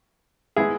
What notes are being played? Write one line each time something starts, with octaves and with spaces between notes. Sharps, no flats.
G#3 B3 E4 G#4